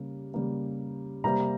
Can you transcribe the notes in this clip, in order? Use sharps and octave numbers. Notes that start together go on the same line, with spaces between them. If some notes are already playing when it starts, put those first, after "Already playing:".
Already playing: C#3 G3 A#3
C#3 G3 A#3
C3 G3 A#3 A#5